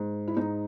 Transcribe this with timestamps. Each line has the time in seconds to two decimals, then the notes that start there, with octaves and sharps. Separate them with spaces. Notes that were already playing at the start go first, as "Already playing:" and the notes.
Already playing: G#2
0.28 E4
0.37 G#2 D#4